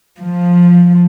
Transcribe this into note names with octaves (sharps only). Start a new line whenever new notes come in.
F3